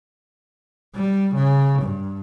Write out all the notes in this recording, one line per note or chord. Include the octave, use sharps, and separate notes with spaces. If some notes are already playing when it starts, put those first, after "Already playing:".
G3
C#3
G2